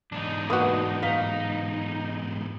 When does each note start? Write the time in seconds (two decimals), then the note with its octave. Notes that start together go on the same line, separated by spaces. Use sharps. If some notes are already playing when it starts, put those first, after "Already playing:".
0.12 E2 G#2 D4 D#4
0.50 A#3 F#4 B4 D#6
1.03 D#4 F5 B6